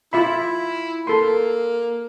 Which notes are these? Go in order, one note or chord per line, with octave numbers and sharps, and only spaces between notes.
E4 F4 E5 B5
A#3 A4 C6